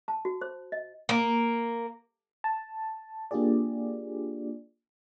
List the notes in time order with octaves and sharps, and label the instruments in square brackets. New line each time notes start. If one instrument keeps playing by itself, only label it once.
[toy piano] A5
F#4
C5
D#5
[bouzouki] A#3
[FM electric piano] A5
A#3 D4 F4 G4 G#4 D5